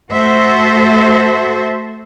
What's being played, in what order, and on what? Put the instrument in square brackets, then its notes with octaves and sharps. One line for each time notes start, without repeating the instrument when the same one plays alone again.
[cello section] A3 F#4 A4 C5 E5